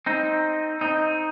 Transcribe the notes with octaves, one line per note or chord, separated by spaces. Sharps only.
C4 D#4
C4 D#4